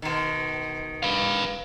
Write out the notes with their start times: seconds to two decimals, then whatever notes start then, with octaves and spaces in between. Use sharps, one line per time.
0.02 B2 D#3
1.03 B4 F5